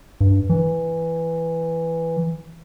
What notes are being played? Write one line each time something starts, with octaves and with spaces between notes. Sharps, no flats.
G2
E3